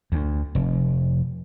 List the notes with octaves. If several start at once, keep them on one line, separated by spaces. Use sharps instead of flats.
D2
F1